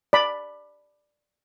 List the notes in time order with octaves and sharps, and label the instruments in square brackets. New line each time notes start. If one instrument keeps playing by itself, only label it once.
[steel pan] D5 B5